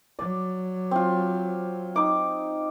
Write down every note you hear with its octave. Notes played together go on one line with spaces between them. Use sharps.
F#3 D5
C4 F4
D#4 D6